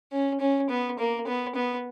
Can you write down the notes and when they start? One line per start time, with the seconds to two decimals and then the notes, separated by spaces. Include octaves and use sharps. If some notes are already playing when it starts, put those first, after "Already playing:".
0.12 C#4
0.40 C#4
0.70 B3
0.99 A#3
1.27 B3
1.55 B3